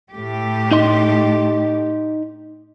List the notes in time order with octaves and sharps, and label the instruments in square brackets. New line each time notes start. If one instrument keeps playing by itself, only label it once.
[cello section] A2 A3 G4
[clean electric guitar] D#4 D#5 C6